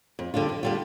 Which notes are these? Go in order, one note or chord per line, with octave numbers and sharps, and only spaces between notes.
F2
D3 G3 D4 F4
F2
D3 G3 D4 F4